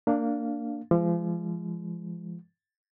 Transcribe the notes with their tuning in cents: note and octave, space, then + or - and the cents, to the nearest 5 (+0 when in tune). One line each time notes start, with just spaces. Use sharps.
A#3 -20 D4 +0 F5 +0
F3 -35 G#3 -5